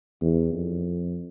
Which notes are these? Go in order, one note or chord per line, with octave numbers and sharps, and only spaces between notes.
E2
F2